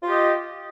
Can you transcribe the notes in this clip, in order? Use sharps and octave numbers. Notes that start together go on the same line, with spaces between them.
F4 G4 D#5